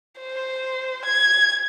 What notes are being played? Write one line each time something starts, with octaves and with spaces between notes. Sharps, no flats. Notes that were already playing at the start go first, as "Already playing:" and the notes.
C5
G#6